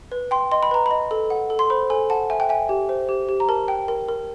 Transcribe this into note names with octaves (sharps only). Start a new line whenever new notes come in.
B4
G5 C6
D#5 C6
B5
B4 A#5
D#5 B5
A4
F#5
A4
C6
C5 B5
A4 G#5
F#5 A5
E5 G#5
G5
E5 G#5
G4
C5
G4
G4
A#5
A#4 A5
G5
A#4
A#4